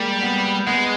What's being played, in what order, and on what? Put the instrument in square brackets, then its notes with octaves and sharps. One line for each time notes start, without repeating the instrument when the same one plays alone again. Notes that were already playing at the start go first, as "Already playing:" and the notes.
Already playing: [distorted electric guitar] G3 [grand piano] G#3 A#3
[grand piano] B3
[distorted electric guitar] G#3 [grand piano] B3